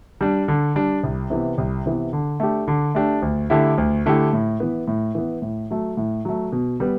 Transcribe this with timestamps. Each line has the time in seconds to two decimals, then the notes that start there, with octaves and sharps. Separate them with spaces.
0.21 G3 D4
0.48 D3
0.76 G3 D4
1.04 C2
1.30 C3 E3 B3
1.58 C2
1.86 C3 E3 B3
2.13 D3
2.40 A3 D4 G4
2.68 D3
2.95 A3 D4 G4
3.22 D2
3.50 D3 A3 E4 G4
3.78 D2
4.06 D3 A3 E4 G4
4.33 A2
4.60 E3 B3
4.88 A2
5.15 E3 B3
5.42 A2
5.70 F#3 A3
5.97 A2
6.25 F#3 A3
6.52 B2
6.80 G3 B3